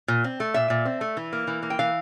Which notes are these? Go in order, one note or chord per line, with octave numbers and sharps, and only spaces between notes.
A#2
C4
A3
A#2 E5
A#2
C4
A3
E3
A#3
E3
A#3
G5
E3 F5